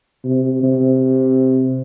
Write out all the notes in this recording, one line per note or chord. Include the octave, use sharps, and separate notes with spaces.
C3
C3